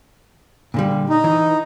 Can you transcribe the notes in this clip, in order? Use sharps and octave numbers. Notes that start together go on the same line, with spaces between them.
A#2 D3 G3
D#4
E3